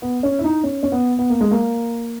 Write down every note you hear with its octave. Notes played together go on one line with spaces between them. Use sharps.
B3
C#4
E4
D#4
C#4
C#4
B3
B3
A#3
G#3
A#3